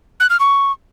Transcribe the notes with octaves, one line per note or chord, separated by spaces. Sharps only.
F#6
F6
C#6